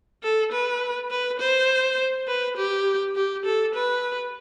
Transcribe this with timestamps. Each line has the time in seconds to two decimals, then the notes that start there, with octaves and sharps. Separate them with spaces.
0.23 A4
0.52 B4
1.10 B4
1.40 C5
2.28 B4
2.57 G4
3.15 G4
3.45 A4
3.74 B4